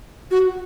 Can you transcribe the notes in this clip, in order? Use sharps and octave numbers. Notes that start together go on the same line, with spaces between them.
F#4